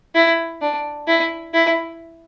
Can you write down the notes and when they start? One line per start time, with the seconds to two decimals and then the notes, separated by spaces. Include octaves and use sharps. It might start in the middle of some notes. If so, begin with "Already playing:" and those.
0.15 E4
0.61 D4
1.08 E4
1.54 E4